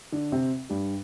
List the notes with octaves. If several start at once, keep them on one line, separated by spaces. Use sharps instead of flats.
D3 D4
C3 C4
G2 G3